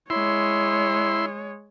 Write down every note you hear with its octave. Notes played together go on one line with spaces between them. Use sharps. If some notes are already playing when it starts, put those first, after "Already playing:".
G#3 E4 C#5 C6